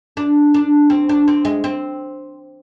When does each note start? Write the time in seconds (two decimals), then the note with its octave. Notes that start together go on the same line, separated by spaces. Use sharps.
0.17 D4
0.54 D4
0.90 C4
1.09 D4
1.28 C4
1.45 G#3
1.64 C4